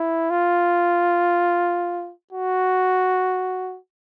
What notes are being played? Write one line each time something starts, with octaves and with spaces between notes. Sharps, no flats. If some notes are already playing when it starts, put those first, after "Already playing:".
Already playing: E4
F4
F#4